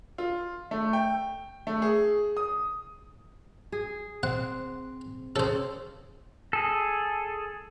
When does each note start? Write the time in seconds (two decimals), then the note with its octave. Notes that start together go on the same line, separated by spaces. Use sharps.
0.18 F4
0.71 A3
0.93 G5
1.67 A3
1.82 G#4
2.37 D#6
3.72 G#4
4.23 C4 F#5
5.36 C#3 C4 A4 C5
6.53 G#4 A4